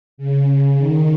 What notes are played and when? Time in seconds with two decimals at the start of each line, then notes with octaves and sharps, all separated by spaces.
0.18 C#3
0.78 D#3